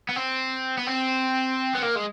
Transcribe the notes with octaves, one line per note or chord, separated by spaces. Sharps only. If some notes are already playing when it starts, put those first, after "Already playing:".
B3
C4
B3
C4
B3
A#3
G#3